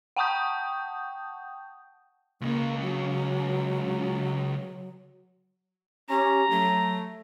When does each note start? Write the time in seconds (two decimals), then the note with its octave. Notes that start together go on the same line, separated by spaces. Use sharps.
0.16 F#5 G5 A5 C#6 D#6 G6
2.41 C#2 C#3 A#3
2.81 F#3
6.10 C#4 G4 A#5
6.50 F#3 A3